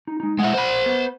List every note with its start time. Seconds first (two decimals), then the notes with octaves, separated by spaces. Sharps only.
0.07 D#4
0.20 G#3 D#4
0.40 G#3 E4 F#5
0.55 C5 B5
0.86 B3